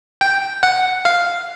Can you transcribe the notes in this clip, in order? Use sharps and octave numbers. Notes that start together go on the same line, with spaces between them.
G5
F#5
F5